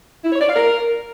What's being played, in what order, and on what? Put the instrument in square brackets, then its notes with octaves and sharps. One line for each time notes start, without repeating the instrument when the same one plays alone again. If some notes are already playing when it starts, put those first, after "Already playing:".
[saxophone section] E4
C#5
D5
F5
A#4